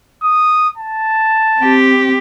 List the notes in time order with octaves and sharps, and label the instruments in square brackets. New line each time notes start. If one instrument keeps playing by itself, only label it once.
[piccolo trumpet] D#6
A5
[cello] C4 G4